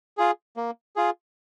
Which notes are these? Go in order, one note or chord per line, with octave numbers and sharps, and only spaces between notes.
F4 G#4
A#3
F4 G#4